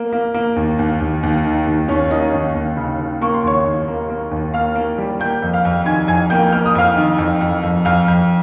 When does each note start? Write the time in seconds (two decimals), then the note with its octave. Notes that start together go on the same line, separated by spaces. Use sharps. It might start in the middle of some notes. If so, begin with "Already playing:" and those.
Already playing: A#3
0.13 A#3
0.34 A#3
0.56 D#2
0.79 D#2
1.00 D#2
1.23 D#2
1.45 D#3
1.67 D#2
1.88 D#2 C#4 C#5
2.11 A#3 D#4 D#5
2.33 D#2
2.55 D#2
2.77 C#3
2.99 C#3
3.21 A#3 C#6
3.34 C6
3.44 D#2 C#5 C#6
3.65 D#2
3.88 A#3
4.10 A#3
4.31 D#2
4.54 A#3 F5 F6
4.75 A#3
4.98 G3
5.20 A#3 G5 G6
5.42 F2
5.53 F5 F6
5.65 F2
5.86 D#3 G#5 G#6
6.08 F2 G#5 G#6
6.30 A#3 G5 G6
6.52 A#3 F6
6.66 D#6
6.75 F2 F5 F6
6.97 D#3
7.18 F2
7.41 F2
7.63 F2
7.85 F2 F5 F6
8.08 F2